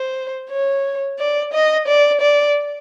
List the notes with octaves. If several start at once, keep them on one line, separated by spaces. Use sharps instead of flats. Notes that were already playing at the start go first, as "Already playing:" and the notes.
Already playing: C5
C#5
D5
D#5
D5
D5